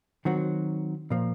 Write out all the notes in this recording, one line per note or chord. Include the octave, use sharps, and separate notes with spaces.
D#3 F#3 C4 F#4
A#2 F3 A#3